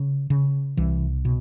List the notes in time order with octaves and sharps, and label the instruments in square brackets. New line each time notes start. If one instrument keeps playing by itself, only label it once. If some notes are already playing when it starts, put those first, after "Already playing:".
Already playing: [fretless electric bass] C#3
C#3
C2 E3
B2